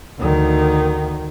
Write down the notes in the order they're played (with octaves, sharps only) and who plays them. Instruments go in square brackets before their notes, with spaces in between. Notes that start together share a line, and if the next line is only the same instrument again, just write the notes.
[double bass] D2 D#3